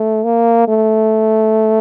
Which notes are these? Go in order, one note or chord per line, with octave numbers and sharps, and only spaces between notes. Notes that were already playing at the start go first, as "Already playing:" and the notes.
Already playing: A3
A#3
A3